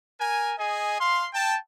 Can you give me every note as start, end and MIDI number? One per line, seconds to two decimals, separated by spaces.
0.21 0.53 70
0.21 0.53 80
0.58 0.96 68
0.58 0.96 75
0.58 0.96 80
1.00 1.27 77
1.00 1.27 84
1.34 1.56 79
1.34 1.56 81